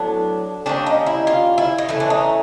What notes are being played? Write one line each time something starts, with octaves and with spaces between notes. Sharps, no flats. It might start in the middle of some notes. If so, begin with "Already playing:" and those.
Already playing: A2 F#3 B3 D4
D#3 G3 A#3 C#4 D4
D#4
E4
F4
E4
D#4
E3 A3 C#4 E4
D4
D#4